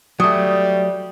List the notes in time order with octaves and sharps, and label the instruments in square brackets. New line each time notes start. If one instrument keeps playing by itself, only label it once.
[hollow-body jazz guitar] F#3 A3 [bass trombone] G3 [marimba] D#6